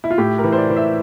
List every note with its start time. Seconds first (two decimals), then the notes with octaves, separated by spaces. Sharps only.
0.04 E4
0.10 F4
0.18 A2 G4
0.38 A#4
0.44 E3
0.52 C5
0.58 D5
0.70 E3
0.76 E5